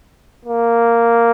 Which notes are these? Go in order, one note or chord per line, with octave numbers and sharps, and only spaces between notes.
A#3